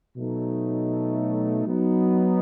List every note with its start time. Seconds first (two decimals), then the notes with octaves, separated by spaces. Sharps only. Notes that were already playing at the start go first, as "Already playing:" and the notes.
0.17 B2 F#3 A3 D#4
1.66 F#3 B3 D#4